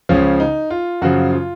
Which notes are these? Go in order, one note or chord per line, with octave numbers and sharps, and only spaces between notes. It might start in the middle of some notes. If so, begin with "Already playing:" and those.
C#2 C#3 F3 C#4
D#4
F4
F#2 C#3 F3 F#4
F4